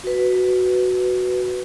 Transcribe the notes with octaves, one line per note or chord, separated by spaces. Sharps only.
F#4 B4